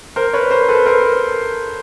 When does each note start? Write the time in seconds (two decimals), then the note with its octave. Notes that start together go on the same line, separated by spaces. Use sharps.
0.16 A#4 C5
0.33 B4 C#5
0.51 A#4 C5
0.69 A4 B4
0.86 A#4 C5